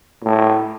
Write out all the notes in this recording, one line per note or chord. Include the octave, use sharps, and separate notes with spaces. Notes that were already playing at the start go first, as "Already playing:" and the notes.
A2